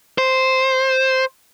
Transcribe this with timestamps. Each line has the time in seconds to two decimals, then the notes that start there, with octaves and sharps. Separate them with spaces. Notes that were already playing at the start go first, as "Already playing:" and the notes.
0.18 C5